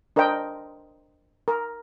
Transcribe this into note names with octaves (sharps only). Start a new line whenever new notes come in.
D4 A#4 C5 D#5 G5
A#4